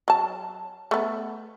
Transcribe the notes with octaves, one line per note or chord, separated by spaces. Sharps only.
F#3 A5
A3 B3